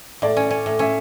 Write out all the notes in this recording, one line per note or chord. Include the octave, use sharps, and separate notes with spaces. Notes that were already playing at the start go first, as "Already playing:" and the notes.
A2 D5
C#4
C#4
A2
C#4 E5